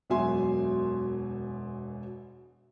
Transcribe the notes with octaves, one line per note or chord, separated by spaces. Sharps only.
E1 F#2 B2 E5 G#5 C6